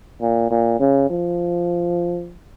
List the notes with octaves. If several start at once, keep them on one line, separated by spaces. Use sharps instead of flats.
A#2
A#2
C#3
F3